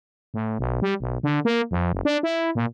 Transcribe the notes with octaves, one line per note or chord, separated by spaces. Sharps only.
A2
B1
G3
B1
D3
A#3
F2
F#1
D4
E4
A#2